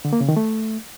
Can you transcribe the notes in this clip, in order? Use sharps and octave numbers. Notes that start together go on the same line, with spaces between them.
D3
A#3
C#3
D#3
A3